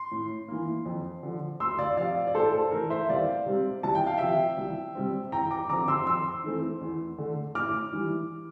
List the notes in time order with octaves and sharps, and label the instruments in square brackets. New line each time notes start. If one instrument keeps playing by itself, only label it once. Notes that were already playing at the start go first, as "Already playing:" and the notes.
Already playing: [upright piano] C6
A2
E3 A#3
F2
D3 F3
D2 C6 E6
D5 F5
C3 F3 D5 F5
D5
A2 A4 C5
A4
E3 A3 A#4
C5 E5
C2 D5 F5
C3 G3 C4
C2 A5
G5
F5
C3 F3 E5 G5
C2
C3 G3 C4
E2 G5 A#5
A#5 D6
D3 F3 C4 A#5 D6
C6 E6
F2 C6 E6
E3 A3 C4
E2
D3 A3
A2 D6 F6
E3 G3